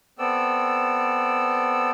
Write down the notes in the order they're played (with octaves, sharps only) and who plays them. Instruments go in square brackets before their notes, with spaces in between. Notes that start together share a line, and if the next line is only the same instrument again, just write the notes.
[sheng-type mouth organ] B3 C4 A4 D5 E6